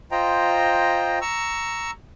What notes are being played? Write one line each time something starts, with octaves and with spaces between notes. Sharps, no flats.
F4 C5 D#5 G5 A#5
A#5 C#6 E6